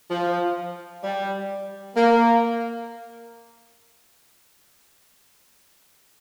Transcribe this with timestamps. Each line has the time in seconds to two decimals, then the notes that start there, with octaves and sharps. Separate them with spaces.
0.11 F3
1.04 G3
1.96 A#3